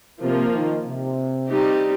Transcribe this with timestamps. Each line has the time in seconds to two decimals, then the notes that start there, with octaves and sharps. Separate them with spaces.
0.22 C3 F3 A#3 F4
0.54 D#3
0.85 C3
1.47 G3 C4 D#4 G4